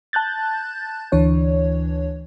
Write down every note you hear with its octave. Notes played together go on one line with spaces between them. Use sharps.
A5 F#6 G6 A6
D2 E3 D4 C#5